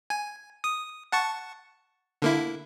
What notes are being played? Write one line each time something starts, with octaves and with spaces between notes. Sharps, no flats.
G#5
D#6
F#5 A5 C#6
D3 A#3 E4